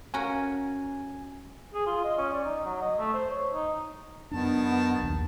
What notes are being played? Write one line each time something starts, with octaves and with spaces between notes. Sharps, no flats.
C#4 F#4 A#4 G#5
G#4
F4
D#5
C#4
D5
D#4
F#3
D#5
A3
C5
C#5
D#4
F#2 D#3 B3 D4 A5
A#1 D#2